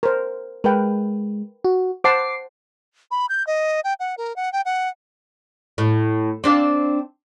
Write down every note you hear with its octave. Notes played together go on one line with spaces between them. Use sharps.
A#4 C5
G#3 A#4 B4 G5
F#4
C5 F#5 A5 D6 C7
B5
G6
D#5
G5
F#5
A#4
F#5
G5
F#5
A2
C4 D4 F5